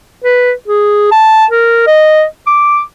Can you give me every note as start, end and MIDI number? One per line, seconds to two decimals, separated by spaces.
0.24 0.52 71
0.68 1.09 68
1.11 1.45 81
1.51 1.87 70
1.87 2.24 75
2.47 2.81 86